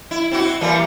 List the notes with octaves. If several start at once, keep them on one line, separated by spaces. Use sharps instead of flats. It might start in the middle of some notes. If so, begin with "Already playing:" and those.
E4
C4 E4 F#4
E3 G3 A#3